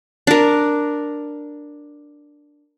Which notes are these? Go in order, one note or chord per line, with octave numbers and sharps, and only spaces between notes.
D4 A#4